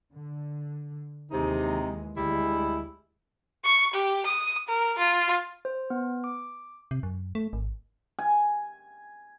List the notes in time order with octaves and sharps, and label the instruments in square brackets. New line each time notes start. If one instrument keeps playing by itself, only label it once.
[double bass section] D3
[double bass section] D#2 E3 G#3 [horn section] C3 D#4
[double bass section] D2 [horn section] G3 G#3 E4
[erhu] C#6
G4
D#6
A#4
F4
[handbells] C5
B3
D6
[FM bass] C3
F#2
A3
G#1
[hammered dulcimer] G#5